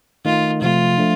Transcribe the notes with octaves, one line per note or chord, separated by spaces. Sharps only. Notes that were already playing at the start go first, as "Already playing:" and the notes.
D#3 A3 D#4 F4 A#4 D#5
C3 F3 A3 F4
F3 A3 D4